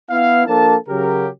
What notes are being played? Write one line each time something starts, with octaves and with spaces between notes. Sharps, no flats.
B3 E4 F5
F3 A#3 D4 A4 A#4 A5
C#3 F#3 G4 A#4